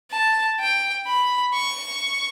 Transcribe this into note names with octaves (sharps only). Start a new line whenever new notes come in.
A5
G5
B5
C#6